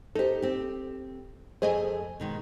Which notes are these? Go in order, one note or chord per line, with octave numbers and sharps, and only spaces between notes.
D#4 G4 A4 C5
C4 G4
F2 A3 G#4 C5 D#5 G#5
B2 D#3 G#3